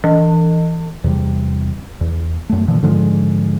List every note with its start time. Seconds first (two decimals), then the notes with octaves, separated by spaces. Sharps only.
0.04 E3
1.04 E2 C3 G3
2.01 E2
2.49 F#2 A3
2.68 A#2 D3 E3 F3
2.82 G#2 D3 F3 G#3